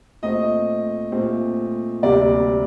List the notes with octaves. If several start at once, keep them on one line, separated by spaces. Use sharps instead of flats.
A#2 A3 C4 D#5
A#2 A3 C4
D2 C3 G3 A#3 D5